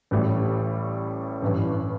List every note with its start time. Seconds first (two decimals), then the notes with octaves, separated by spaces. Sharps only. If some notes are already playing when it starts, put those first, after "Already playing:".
0.11 A1 A2 G3
1.42 A1 G2 E3